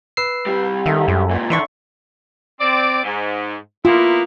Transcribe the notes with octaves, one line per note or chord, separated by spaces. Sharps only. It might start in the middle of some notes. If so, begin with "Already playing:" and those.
B4 E6 C7
C2 G3
D#3 A4 E5
F#2
C#2 A#2
D#3 E3 D4 E5 C6 C#6
C4 D5
G#2
A#3 B3 E4 F4